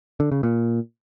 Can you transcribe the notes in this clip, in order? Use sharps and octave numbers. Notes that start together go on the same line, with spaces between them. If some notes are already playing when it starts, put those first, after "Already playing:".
D3
C#3
A#2